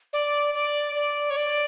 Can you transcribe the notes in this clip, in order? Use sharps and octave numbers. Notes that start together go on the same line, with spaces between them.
D5
D5
D5
C#5
D5